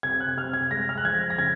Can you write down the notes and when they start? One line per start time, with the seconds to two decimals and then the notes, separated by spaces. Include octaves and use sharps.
0.03 C3 G#6
0.20 F#6
0.37 C3 F6
0.53 G#6
0.71 G#3 A#6
0.89 F6
0.98 F#6
1.05 F3 G#6
1.30 A#6
1.38 C#3 G#6